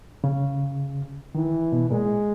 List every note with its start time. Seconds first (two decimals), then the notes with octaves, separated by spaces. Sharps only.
0.24 C#3
1.35 D#3 E3
1.72 B2
1.90 A#2 G#3